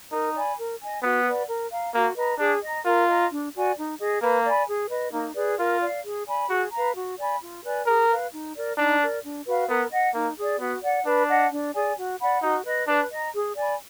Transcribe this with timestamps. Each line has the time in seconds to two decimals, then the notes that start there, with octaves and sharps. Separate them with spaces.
0.11 D#4 A#4
0.34 D5 G#5 B5
0.58 A#4
0.80 D#5 G#5
1.02 B3 F#4
1.25 B4 D5 F#5
1.49 A#4
1.71 F5 A#5
1.94 A#3 F#4
2.17 B4 D#5 A#5
2.39 D4 G#4
2.62 D#5 A#5
2.85 F4 A#4
3.08 D#5 A#5
3.31 D4
3.54 F#4 D5 G#5
3.77 D#4
4.00 G#4 D#5
4.21 A#3 B4
4.44 D5 G#5 B5
4.67 G#4
4.90 B4 D#5
5.13 A#3 D#4
5.35 G#4 B4 D5
5.59 F4 A#4
5.82 D5 F5
6.04 G#4
6.27 D5 G#5 B5
6.49 F#4 G#4
6.72 B4 F5 A#5
6.96 F#4
7.18 D5 G#5 B5
7.41 F4
7.64 B4 D5 G#5
7.86 G#4 A#4
8.09 B4 F5
8.33 D#4
8.54 A#4 D5
8.77 D4 D#4
9.00 A#4 D5
9.23 D4
9.46 F#4 B4 F5
9.69 B3 A#4
9.91 D#5 F#5
10.14 A#3 D#4
10.37 G#4 D5
10.60 B3 F#4
10.82 D5 F#5
11.06 D4 B4
11.28 D#5 F#5
11.51 D4
11.74 G#4 D5 G#5
11.97 F#4
12.20 D5 F#5 B5
12.42 D#4 F#4
12.65 B4 D#5
12.87 D4 B4
13.10 D#5 A#5
13.33 G#4
13.56 D5 G#5 B5